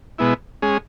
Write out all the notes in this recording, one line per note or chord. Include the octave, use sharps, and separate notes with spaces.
B2 G#3 B3 E4
G#3 C#4 G#4